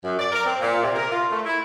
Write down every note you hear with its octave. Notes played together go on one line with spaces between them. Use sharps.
F#2
D5
A#4
C4
A#2
C3
A#4
F4
A3
E4